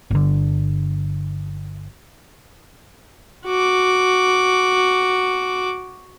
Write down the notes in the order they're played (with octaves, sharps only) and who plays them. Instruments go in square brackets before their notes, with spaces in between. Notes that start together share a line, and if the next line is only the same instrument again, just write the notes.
[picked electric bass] G1 D3
[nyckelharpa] F#4 D6